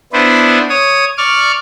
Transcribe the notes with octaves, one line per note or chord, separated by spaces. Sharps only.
B3 D4 E4 B4 C5
C#5 D#6
D5 C#6 D6 F6